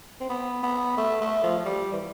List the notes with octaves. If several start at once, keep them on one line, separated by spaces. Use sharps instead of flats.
C4
B3
B3
A3
A3
F3
F3
G3
E3